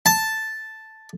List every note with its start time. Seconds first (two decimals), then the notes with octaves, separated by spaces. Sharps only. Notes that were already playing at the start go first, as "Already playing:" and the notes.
0.06 A5